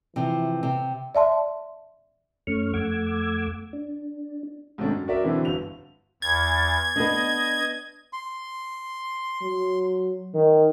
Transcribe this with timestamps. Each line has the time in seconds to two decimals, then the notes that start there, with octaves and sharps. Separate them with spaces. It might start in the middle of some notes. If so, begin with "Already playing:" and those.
0.16 C3 E3 F3
0.63 C3
1.15 D5 E5 A5 C6
2.47 F#2 A3 C#4 C#6 F6
2.74 F2 A3 F#5 D6 E6 G#6
3.73 D4
4.78 G#2 C3 D#3 A3 C#4 D4
4.90 F#2
5.08 F#4 A#4 D5 E5
5.23 B2 D3 E3 B3 C4 E4
5.45 G1 F#4 F7
6.22 E2 G#6 A6
6.96 B3 D4 D#5
8.13 C6
9.42 F#3
10.34 D#3